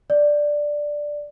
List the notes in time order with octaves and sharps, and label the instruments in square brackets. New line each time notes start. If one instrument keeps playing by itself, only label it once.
[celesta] D5